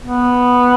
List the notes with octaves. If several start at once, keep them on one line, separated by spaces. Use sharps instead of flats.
B3